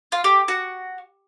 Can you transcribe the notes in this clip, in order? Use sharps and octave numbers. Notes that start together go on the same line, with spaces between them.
F4
G4
F#4